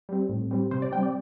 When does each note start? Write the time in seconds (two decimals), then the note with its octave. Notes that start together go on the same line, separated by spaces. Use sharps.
0.09 G3 C4
0.29 A2
0.51 G3 C4
0.71 C3 C5
0.82 D5
0.92 G3 C4 G5
1.03 D5